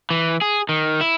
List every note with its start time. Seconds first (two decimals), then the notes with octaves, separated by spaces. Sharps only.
0.10 E3
0.42 G#4
0.69 D#3
1.01 E4